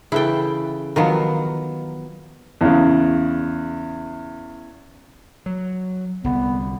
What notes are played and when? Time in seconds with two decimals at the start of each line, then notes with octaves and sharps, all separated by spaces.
0.12 C#3 E3 E4 A4 G5
0.96 D#3 F3 F#3 B3 A#4
2.61 E2 C#3
5.46 F#3
6.24 C2 D3 G3 B3